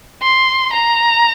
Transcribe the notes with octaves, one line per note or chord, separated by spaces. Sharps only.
C6
A#5